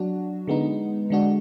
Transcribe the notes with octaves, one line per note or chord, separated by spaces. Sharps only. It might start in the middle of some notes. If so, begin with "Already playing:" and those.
Already playing: F#3 D4 F#4
D3 G#3 B3 D#4
D3 G#3 D4 F#4